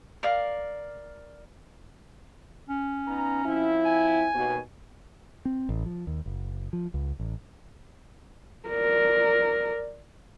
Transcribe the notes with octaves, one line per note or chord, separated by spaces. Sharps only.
A#4 D5 F5
C#4
B3 D#4 A#5
F3 C4 E4
G#5
D#2 B2
C4
A1
F3
D#2
F#1
F3
C#2
A1
A#4 D5